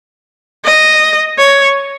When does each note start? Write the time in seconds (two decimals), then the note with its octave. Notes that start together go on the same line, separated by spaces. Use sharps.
0.64 D#5
1.38 C#5